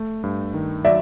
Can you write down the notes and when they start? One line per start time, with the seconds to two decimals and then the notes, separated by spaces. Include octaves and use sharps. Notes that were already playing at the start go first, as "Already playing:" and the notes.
Already playing: A3
0.24 G2
0.54 D#3
0.85 F#3 D5 E5